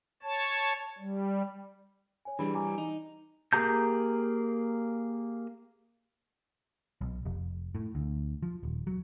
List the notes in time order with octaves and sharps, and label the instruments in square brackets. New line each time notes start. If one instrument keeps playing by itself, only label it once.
[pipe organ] C#5 A5
G3
[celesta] C#5 G#5
[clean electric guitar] E3 G3 [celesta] D4 G#4 B5
[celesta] G#5 A#5 D6
[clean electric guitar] D#4
[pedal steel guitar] A#3 G4 G#4 A#5 G6
[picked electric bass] B1
F1
A2
D2
F3
D#1
F#3